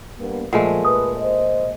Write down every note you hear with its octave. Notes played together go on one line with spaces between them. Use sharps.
G2 A#3 B3
A#2 F3 G#3 A3 F#5 G#5
B4 D#6
C5 D#5